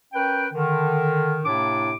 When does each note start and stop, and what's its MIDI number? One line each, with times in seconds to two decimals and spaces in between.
0.13 0.48 61
0.13 0.48 70
0.13 0.48 71
0.13 0.48 79
0.53 1.39 50
0.53 1.39 51
1.45 1.93 45
1.45 1.93 48
1.45 1.93 58
1.45 1.93 62
1.45 1.93 64
1.45 1.93 86